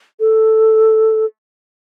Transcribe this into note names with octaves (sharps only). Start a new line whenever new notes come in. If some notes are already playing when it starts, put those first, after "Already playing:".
A4